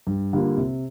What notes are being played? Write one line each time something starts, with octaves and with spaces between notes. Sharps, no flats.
G2
D3 G3 A#3 F4
C3